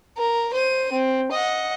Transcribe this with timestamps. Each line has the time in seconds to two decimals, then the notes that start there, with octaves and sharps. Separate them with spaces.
0.18 A#4
0.53 C5 D#7
0.92 C4
1.31 D#5 F#5